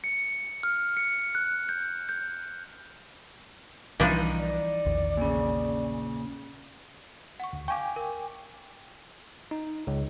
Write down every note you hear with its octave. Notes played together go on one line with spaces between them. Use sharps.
C#7
F6
C#7
F#6
G6
G6
B1 E3 F3 G3 D4 D#4
D5
A#1 E2 D#3
A#2 C#3
F#5 C#6
D2
F5 G5 G#5 C#6 D6
A#4
D#4
C#2